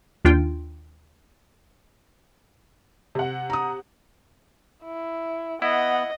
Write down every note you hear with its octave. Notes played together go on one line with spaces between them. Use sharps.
D#2 D4 F4 G5
C3 F#5
A#5 D#6
E4
B3 E4 D#5 F#5